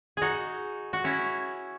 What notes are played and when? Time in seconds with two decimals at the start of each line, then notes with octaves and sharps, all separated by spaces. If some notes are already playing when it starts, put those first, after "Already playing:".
0.17 D#4 F#4 G#4
0.93 F#4
1.04 C#4 E4